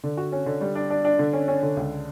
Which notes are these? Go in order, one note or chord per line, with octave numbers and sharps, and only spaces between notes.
D3
F#4
C#4
D3
G3
D4
D4
D4
D3
C#4
C#4
D3
C#2